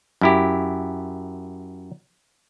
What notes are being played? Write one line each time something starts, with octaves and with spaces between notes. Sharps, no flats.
F#2 E4 G4